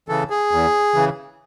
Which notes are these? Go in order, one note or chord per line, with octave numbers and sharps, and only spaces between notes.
C#3 E3 A4
G#4
E2
C#3 E3